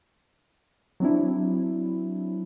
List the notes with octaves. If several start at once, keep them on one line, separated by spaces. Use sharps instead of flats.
F#3 C4 D4 E4